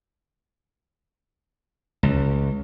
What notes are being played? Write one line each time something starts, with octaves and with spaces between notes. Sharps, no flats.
C#2